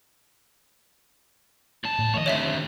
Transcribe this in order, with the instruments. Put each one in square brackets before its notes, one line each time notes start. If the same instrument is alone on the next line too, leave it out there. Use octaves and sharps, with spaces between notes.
[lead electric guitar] D#2 A5
[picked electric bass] A2
[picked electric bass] D#3 F3 A3 [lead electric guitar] C#5 D#5
[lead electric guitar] D2 C3 [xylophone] C#5 E5 B6